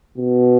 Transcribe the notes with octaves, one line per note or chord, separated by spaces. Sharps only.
B2